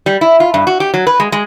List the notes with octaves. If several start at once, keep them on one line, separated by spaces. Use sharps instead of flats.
G3
E4
F4
G2
F#4
G4
F#3
B4
G#3
G#3